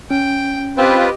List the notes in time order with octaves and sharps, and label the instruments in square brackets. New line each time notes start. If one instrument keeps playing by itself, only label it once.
[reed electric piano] C#4 [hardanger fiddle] G5
[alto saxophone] C4 [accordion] F4 B4 [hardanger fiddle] G4 D#5